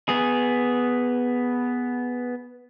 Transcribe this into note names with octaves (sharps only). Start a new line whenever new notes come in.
B3 G#4